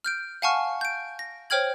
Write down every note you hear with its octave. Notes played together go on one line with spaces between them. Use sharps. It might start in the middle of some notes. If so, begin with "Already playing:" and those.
F6 G6 D7
F5 F#5 G#5 A5 C#6 F6
G6 D7
A#6
C5 C#5 G5 F6 G#6 F#7